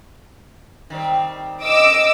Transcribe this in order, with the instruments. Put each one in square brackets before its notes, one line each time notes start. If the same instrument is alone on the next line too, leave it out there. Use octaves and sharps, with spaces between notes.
[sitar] D#3 G3 C4
[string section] D#5 D6 E6